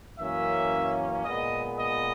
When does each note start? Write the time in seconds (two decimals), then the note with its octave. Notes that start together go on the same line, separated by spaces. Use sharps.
0.19 F#2 E3 A#3 C#4 E5
1.25 A#2 G#3 B3 D#5
1.79 D#5